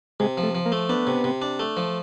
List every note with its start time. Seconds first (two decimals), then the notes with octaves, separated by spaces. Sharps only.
0.20 C3 G#3
0.38 F3
0.43 A3
0.55 F3
0.66 A#3
0.72 A3
0.89 B3 D4
1.07 C3
1.24 C3
1.42 D4
1.60 A3
1.77 F3